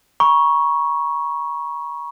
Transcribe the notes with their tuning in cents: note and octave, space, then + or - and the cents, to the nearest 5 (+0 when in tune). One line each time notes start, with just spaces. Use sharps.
A#5 +45 C#6 +0